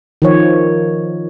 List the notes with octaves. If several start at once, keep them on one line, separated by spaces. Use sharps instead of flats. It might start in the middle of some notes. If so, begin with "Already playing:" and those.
D#3 F3 C#5